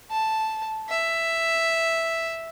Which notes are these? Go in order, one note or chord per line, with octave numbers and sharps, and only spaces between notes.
A5
E5